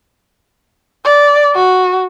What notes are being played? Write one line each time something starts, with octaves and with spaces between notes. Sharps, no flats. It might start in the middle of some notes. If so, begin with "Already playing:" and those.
D5
F#4